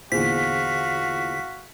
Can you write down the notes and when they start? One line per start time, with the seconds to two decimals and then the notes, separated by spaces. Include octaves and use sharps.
0.12 E2 A#2 D3 F#4 G#4 C5 F5 B6